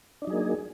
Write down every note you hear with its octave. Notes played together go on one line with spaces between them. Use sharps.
F#3 A#3 D4 D#4 G#4